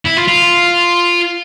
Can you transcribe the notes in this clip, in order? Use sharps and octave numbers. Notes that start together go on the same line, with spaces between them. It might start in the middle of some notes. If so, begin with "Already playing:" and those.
E4
F4
F4